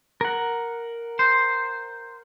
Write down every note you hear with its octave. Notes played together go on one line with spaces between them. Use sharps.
A#4 F#5
C5